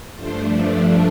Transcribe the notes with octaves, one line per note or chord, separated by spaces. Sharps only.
G2 F3 A3 D4 C5